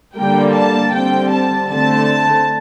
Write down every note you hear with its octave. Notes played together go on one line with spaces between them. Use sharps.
D3 G3 A#3 G5
A5
D3 G3 C4 G5
A5
D3 A3 C4 A5